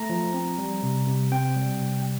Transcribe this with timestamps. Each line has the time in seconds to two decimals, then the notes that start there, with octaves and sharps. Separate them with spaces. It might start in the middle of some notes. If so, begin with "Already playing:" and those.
Already playing: A3 A#5
0.10 F3
0.34 C4
0.58 G3
0.83 C3
1.07 C3
1.32 C4 G5
1.56 G3
1.80 C3